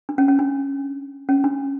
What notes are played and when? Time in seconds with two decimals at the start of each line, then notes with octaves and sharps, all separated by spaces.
0.09 D4
0.18 C#4
0.28 C#4
0.39 D4
1.29 C#4
1.44 D4